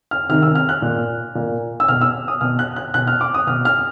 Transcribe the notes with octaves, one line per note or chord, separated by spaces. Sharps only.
F6
C3 D#3 F6
E6
F6
F#6
A#2
A#2
E6
B2 F6
E6
D#6
B2 F6
F#6
F#6
B2 F#6
F6
D6
D#6
B2 F6
F6